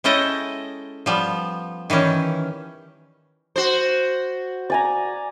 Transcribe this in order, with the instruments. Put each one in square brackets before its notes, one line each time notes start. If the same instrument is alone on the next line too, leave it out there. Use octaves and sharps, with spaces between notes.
[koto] G#3 C#4 E4 A4 D#5 G5
F3 G3 B3
D#3 E3 G3 C#4
[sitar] F#4 C5
[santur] D5 G#5 A#5